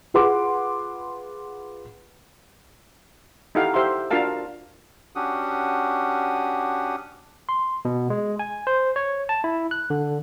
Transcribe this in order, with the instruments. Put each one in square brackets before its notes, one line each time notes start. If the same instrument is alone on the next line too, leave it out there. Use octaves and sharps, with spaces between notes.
[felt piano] F4 G#4 B4 F#5 C6 D6
[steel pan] D#4 E4 G4 A4 F5 F#5
G4 C5 E5 F5 C6
D4 F4 F#4 A#4 F5 A5
[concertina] C#4 D4 F#4 G4 F#5 D#6
[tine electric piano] C6
B2
G#3
G#5
C5
C#5
A5
E4
F#6
D3